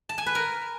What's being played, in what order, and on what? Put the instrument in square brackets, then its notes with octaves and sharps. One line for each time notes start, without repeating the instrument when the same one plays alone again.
[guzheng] A5
G#5
B4
A#4